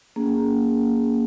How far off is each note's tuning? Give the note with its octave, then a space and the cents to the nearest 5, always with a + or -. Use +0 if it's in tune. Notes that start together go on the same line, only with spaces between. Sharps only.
A#3 +0 C#4 +25 G#4 +0